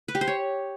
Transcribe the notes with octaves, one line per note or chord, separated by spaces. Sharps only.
B4
G4
C5
C#5